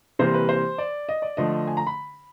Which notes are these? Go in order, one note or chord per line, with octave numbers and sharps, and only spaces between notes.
C3 E3 G3 A#3 C5
B4
C5
D5
D#5
D5
D3 F3 A3 D#5
G#5
A#5
B5